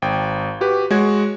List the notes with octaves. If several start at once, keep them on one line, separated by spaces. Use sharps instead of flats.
G#1 G5
F#4 G4 B4
G#3 F#4 C#5 G#6